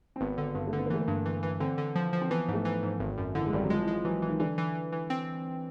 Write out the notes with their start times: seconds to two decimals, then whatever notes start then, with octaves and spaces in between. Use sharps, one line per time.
0.16 C4
0.21 G#1 B3
0.38 D3
0.55 G2
0.67 A3
0.73 D3
0.79 B3
0.86 A#3
0.90 E3 A3
1.01 A#3
1.08 G2
1.26 E3
1.43 E3
1.60 D3 C4
1.78 D3
1.95 F3
2.13 F3
2.21 C4
2.30 E3 B3
2.48 G#2
2.54 A3
2.65 E3
2.83 G#2
3.00 G#1
3.18 F#2
3.35 D3 E3
3.46 G#3
3.53 G#1 G3
3.64 F#3
3.70 F3 G#3
3.82 E3
3.88 G#3
3.93 F3
4.05 E3 F#3
4.22 E3
4.28 D#3
4.40 D3 E3
4.58 E3
4.75 E3
4.92 E3
5.10 C4